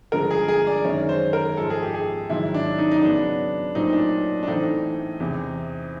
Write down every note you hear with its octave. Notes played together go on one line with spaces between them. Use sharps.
G2 D3 F3 G#3 A#4
G#4
G#4
D5
F#2 D#3 G#3 C#5
C5
A#4
G#2 F3 G#3 A4
G#4
G4
G#4
G#2 D#3 F#3 E4
D4
D#4
D#4
C#3 F#3 B3 D4
A#2 F#3 A3 C4 D#4
D4
D4
A2 E3 A3 C4 D#4
E2 C3 E3